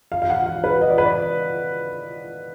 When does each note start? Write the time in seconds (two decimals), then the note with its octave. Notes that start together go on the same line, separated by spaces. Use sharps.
0.12 F5
0.22 F5
0.30 F#5
0.46 F5
0.64 B4
0.81 D#5
0.90 D5
0.98 B4
1.05 D5